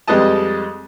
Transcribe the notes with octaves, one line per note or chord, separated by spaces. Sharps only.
F2 G3 G#3 B4 D#5 A5